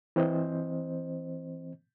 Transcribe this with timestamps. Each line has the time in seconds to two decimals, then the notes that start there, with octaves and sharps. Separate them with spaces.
0.16 E3 C4 C5 D#5